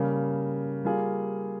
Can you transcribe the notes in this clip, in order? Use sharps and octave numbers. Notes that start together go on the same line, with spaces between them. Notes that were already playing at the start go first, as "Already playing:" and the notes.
Already playing: C#3 G3 A#3
G3 A#3 F4 G#4